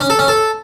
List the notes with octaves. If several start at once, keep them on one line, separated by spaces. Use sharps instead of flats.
C#4
A4
C#4
A4